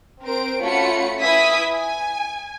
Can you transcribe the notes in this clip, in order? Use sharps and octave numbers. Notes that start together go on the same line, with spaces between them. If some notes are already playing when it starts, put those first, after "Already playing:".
C4 A#4 C5 D7
A3 C#4 F4 F#4 B5 C#7
E4 B4 E5 G#5 D#6 B6
G#5